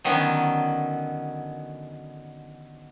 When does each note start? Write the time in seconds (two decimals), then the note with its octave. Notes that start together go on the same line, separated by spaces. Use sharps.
0.04 D3 D#3 F#3 B3 C#4